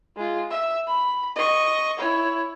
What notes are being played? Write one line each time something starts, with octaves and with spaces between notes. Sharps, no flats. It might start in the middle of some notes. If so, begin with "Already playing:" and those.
G#3 F4
E5
B5
D#5 C#6
E4 C#5